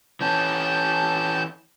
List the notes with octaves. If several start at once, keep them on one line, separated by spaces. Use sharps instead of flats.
E3 C#4 A5 G6